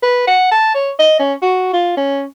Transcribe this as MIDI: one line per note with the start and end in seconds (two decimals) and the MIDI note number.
0.03 0.25 71
0.27 0.50 78
0.52 0.70 81
0.74 0.91 73
0.99 1.16 75
1.19 1.33 61
1.42 1.68 66
1.73 1.95 65
1.97 2.24 61